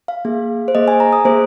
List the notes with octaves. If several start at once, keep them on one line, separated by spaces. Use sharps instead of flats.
F5
A#3 G#4
C5
A#3 G#4 D#5
G#5
A#5
D#6
A#3 G#4 C5